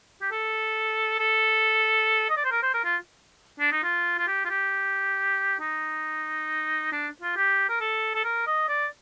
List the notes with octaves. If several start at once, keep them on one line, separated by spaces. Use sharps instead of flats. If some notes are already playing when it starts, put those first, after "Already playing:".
G4
A4
A4
D#5
D5
C5
A#4
C5
A#4
F4
D4
D#4
F4
F4
G4
F4
G4
D#4
D4
F4
G4
A#4
A4
A4
A#4
D#5
D5